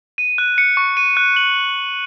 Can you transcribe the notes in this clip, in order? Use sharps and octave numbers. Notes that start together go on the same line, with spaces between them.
D#7
F#6
C#7
C#6
D#7
F#6
F#7